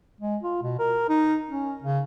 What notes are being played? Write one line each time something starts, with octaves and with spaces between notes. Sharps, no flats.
G#3
F4
B2
A#4
D#4
C#4
C#3